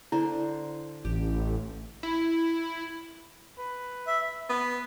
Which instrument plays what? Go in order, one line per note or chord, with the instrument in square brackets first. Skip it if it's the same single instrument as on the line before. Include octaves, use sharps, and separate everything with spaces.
[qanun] D3 C5 [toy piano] E4
[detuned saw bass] A1 [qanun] G4
[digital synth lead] E4
[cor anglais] B4
[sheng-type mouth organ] E5
[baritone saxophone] B3